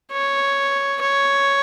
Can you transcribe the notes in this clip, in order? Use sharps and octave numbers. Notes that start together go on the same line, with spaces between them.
C#5
C#5